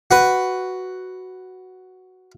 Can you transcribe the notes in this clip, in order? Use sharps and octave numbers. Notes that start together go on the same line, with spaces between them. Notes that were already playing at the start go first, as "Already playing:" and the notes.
F#4 B4